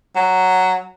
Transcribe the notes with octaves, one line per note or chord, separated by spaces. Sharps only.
F#3